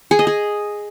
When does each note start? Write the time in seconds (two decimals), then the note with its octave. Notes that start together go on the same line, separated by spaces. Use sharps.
0.11 G#4
0.19 D#5
0.27 G#4